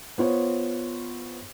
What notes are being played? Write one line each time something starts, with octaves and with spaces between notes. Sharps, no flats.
B3 F4 C5 C#5